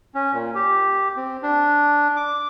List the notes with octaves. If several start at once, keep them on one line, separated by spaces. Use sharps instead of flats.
C#4
A#2
G4
C4
D4
D6